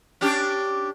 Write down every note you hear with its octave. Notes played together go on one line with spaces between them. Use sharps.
C#4 D4 G4